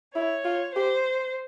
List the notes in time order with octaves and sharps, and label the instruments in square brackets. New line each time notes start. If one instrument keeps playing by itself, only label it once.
[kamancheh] E4 [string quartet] C#5
[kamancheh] F4
[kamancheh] G4 [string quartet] C5